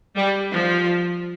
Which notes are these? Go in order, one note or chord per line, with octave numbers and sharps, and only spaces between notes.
G3
F3